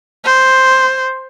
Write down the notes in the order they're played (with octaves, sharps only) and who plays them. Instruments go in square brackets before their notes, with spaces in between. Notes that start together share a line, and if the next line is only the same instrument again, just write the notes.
[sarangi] C5